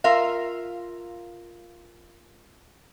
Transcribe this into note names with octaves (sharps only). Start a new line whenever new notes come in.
F4 A#4 E5 F5